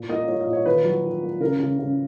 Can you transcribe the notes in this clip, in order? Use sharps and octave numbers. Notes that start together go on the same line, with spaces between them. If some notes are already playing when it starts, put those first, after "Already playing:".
Already playing: A#2
A#3 D#5
A#3 C#5
D#5
A#2
C#5
D#3 B4
F#3
D#3
A#3
C#3 A#4
C#3
C#3